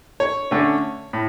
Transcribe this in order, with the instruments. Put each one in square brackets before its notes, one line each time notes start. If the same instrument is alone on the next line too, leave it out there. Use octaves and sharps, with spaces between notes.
[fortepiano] C#5
D3 A3 C#4
A2